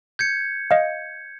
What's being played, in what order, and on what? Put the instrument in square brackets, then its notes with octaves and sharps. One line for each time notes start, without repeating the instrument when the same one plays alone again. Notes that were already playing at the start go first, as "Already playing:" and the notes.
[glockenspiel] G6 G#6 C#7
[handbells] D#5 F5